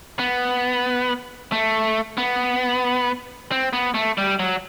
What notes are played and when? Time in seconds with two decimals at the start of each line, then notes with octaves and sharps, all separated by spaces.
0.19 B3
1.52 A3
2.17 B3
3.51 C4
3.73 B3
3.94 A3
4.18 G3
4.40 F#3